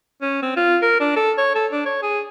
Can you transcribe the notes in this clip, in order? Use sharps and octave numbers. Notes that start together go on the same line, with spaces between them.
C#4
C4
F4
A#4
D4
A4
C#5
A4
D4
C#5
G#4